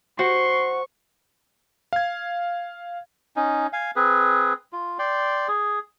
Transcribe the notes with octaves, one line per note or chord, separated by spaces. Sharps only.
F#4 C5 C6 C#6
F5 G#6
C#4 D#4
F5 G#5
C4 G#4 B4
F4
D5 G5 C6
G#4